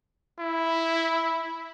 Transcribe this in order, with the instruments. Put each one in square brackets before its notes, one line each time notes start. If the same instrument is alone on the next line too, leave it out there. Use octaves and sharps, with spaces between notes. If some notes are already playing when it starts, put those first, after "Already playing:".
[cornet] E4